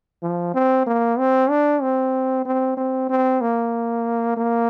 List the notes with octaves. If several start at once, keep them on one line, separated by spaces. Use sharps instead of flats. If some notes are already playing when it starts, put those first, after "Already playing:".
F3
C4
A#3
C4
D4
C4
C4
C4
C4
A#3
A#3